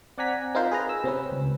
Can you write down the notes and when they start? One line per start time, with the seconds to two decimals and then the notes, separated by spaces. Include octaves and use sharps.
0.18 C4 D5 F#5 G#5 A#5 B6
0.55 C4 D#4 F4 A#4 C5
0.71 G#4 B4 A#5
0.89 E6
1.04 C3 C4 C#4 B4
1.32 C#2